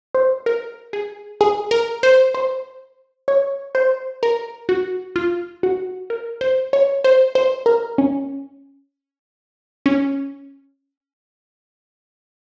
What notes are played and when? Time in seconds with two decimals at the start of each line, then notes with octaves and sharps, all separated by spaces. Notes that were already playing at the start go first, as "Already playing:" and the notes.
0.15 C5
0.46 A#4
0.93 G#4
1.41 G#4
1.71 A#4
2.03 C5
2.34 C5
3.28 C#5
3.75 C5
4.23 A#4
4.69 F#4
5.16 F4
5.63 F#4
6.10 A#4
6.41 C5
6.73 C#5
7.04 C5
7.35 C5
7.66 A#4
7.98 C#4
9.86 C#4